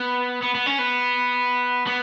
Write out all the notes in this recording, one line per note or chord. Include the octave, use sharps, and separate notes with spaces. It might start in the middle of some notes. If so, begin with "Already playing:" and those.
Already playing: B3
B3
B3
C#4
B3
B3